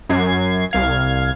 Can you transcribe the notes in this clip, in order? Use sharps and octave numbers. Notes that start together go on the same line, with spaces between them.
F#2 G#6 C7
C2 F5 G#6